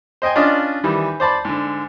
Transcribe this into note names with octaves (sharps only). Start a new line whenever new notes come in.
C5 D#5 G5 G#5
C#4 D4 F4 D5 D#5
D#3 E3 G3
C5 D5 A5 B5
G#2 D3